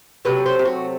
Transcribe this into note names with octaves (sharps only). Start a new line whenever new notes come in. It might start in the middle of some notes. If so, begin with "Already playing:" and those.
C3 F#3 A3 B4
C5
G4
F#4